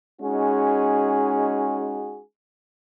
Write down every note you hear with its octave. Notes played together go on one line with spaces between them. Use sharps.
G#3 C#4 D#4 F#4 G#4